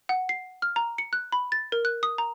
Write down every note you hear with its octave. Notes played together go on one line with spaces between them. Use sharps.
F#5
C7
F6
A#5
C#7
F#6
B5
A6
A#4
F#6
D#6
A#5